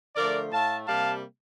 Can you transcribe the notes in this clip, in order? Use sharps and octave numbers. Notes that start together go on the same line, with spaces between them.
D3 F3 A3 A#4 D5
A2 A3 F5 A5
C3 G3 A#3 F5 A5